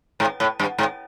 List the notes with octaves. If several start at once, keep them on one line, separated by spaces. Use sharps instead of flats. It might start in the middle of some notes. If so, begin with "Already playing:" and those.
G#2
A2
G2
G#2